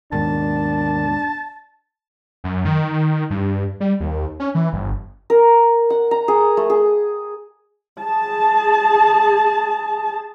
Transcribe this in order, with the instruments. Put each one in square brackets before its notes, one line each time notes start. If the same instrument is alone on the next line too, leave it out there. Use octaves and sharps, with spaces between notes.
[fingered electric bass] D#2 G#2 B2 [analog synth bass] D#3 [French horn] D4 [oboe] A5
[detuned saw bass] F#2
D#3
G2
G3
D#2
C#4
E3
G1
[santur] A#4
F#5
A#5
G#4
A3
G#4
[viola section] G#4 A5